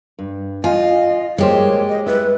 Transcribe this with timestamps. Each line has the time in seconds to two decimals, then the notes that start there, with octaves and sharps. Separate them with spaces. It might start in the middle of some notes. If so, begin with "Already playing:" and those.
0.19 G2
0.64 F4 D#5 F5 G#5
1.38 G3 G#3 A#3 G4 C5 C#5
1.88 D#5
2.06 E4 B4